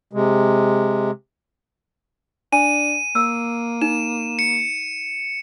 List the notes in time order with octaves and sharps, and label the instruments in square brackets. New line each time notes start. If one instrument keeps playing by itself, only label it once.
[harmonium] C3 G#3
[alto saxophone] D4 [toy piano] G#5 [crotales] D#7
[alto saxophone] A#3 [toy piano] E6
[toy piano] D#4 [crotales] E7
[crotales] C#7